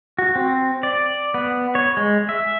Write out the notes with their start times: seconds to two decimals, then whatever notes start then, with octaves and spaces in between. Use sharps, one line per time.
0.18 F#4
0.35 C4
0.83 D5
1.34 B3
1.75 C#5
1.97 G#3
2.29 E5